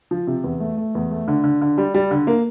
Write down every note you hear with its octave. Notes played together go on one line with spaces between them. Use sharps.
F3
C3
E2
A3
A3
E2
A3
D3
D3
D3
G3
G3
D3
A#3